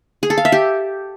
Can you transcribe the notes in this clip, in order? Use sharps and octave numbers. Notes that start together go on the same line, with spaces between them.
G#4
A4
F5
E5
G4